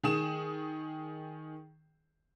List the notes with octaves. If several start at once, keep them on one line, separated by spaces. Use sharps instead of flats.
D#3 G#4 D#6 E7